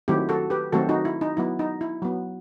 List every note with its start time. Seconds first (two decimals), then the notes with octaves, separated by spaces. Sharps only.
0.08 D#3 F#3 A3 C4 E4 G4
0.29 F#4 A4
0.50 G4 B4
0.73 D#3 F#3 A3 C4 F#4 A4
0.89 D#4 F#4
1.05 E4
1.21 D#4
1.37 F#3 B3 E4
1.59 D#4
1.81 E4
2.02 F#3 B3